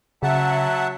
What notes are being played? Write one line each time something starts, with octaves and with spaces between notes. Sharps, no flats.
C#3 F#3 E5 F#5 A5